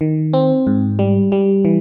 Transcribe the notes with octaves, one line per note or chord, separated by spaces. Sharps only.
D#3
C4
G#2
G3
G3
E3